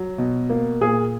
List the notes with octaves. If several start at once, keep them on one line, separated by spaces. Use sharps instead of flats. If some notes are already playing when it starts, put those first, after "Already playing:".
Already playing: F#3
B2
A#3
A#2 G#4